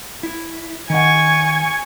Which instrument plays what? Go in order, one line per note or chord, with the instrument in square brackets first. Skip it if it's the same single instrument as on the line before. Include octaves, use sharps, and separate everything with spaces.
[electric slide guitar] E4
[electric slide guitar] D#3 F#5 [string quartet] G#5 C#6 G#6